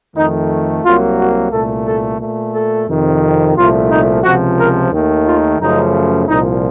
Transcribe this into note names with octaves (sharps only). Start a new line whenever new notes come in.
F2 D#3 A3 D#4
C2 C3 F#3 A#3 F4
F#4
C2 A#2 A3 A4
A4
A#2 A3
A4
F2 C3 D#3
C2 A#2 F3 A3 F4
D#4
C#2 C3 F3 F#4
A#4
D#2 D#3 A3
F4
F#2 C#3 F3 A3 D#4
C2 A#2 F3 D#4